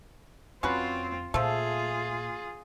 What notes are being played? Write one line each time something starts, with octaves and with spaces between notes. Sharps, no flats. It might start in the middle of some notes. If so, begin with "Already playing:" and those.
F2 C4 C#4 F4 F#4 B4
A#2 F3 A3 F4 G#4